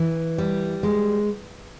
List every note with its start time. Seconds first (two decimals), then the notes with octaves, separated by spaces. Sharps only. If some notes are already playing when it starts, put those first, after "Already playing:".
Already playing: E3
0.38 G3
0.83 G#3